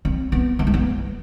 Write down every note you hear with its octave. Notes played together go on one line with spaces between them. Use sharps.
C4
B3
B3
A3
B3